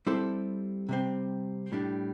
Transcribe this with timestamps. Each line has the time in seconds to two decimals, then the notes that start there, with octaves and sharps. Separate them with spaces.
0.07 G3 C4 E4 A4 C5
0.89 C3 G3 C4
1.72 A2 G3 D4